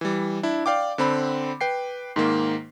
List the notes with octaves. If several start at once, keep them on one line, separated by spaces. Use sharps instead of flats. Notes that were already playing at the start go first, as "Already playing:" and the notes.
E3 G3
D4 E4
D5 F5 G5 D6
D3 C4 B5
B4 G5 C7
G#2 D#3 A#3